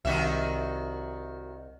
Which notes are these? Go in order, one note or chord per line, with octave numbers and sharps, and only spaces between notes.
C2 D#3 F#4 E5